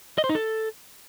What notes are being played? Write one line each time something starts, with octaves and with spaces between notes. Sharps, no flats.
D#5
C5
D#4
A4